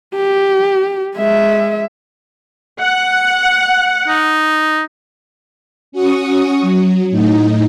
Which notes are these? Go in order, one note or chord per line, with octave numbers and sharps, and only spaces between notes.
G4
G#3 E5
F#5
D#4
C#4 F#4 C#6 D#6
F#3
A2 D#4